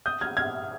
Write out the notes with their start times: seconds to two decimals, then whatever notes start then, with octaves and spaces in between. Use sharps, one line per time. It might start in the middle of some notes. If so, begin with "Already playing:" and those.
0.06 D#6 G6
0.21 F6 G#6
0.37 F6 G#6